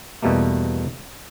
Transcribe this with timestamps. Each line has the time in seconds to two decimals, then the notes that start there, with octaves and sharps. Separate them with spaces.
0.22 E2 B2 G3 A3 A#3